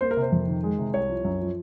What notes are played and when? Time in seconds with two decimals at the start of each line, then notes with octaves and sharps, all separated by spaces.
0.01 A#3 C5
0.11 A#4
0.17 C3
0.22 C5
0.32 F2
0.47 D#3
0.63 G#3
0.78 C3
0.94 C2 C#5
1.09 F3
1.24 F#2
1.41 F3